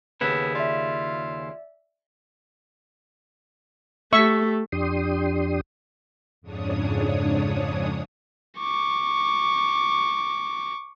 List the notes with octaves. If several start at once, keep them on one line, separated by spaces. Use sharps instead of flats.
D#2 C#3 B3 E4
F4 D5 E5
A3 G4 E5 C#6
F2 D4 G4 C6 D#6
F2 G#2 C#3 D4 C#5 D#6
C#6 D6